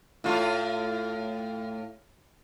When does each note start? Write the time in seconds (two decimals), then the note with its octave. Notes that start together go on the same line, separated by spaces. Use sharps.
0.24 A2 F4